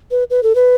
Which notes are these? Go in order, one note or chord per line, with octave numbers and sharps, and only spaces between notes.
B4
B4
A4
B4